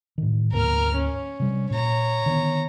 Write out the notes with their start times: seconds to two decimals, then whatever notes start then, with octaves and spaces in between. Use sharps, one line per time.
0.18 A2 D#3
0.53 D2 G#2 A#3 A#4 F6
0.96 C#4
1.40 C3 G3
1.71 A#2 C#5 A#5
2.26 D3 D#3 B3